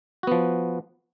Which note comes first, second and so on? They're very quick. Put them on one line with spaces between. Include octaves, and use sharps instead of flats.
F#4 B3 F3